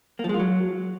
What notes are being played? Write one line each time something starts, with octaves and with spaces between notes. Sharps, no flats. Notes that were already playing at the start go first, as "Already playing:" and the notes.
A#3
F3
G#3
F4
F#3